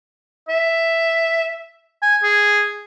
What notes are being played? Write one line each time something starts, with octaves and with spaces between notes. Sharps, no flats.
E5
G#5
G#4